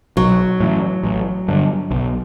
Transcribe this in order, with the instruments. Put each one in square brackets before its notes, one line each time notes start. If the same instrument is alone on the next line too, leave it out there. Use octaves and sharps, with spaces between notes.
[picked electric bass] B1 [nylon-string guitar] F#3
[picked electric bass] A2 E3
A1
G2 D3
B1